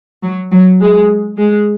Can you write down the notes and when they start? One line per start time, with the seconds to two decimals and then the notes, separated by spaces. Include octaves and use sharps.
0.23 F#3
0.51 F#3
0.81 G#3
1.38 G#3